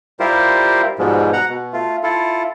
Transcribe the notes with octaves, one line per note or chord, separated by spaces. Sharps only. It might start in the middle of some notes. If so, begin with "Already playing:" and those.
G3 E4 F4 G4 A#4 C5
G#2 B2 F3 G3 G#3
F#5 A#5
B2
A3 F4
E4 F4 A4